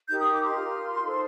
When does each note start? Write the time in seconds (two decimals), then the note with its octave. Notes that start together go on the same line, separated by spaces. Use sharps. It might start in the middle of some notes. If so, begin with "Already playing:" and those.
0.08 D#4 G4 A#4 G6
0.20 D#6
0.32 D6
0.44 C6
0.56 F4 A#4
1.02 D#4 A4 C5